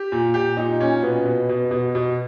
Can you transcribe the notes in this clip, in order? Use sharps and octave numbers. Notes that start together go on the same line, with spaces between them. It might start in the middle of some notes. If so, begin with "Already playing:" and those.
Already playing: G4
A#2
A#2 G4
A#2 D#4
A#2 C#4
B2 B3
B2
B2
B2
B2